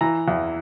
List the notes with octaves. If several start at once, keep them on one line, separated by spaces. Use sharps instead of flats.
E3 A#5
E2